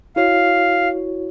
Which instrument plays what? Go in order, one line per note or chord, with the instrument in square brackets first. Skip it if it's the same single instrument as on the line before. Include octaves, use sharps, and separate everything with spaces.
[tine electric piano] E4 F#4 C#5 [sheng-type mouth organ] F5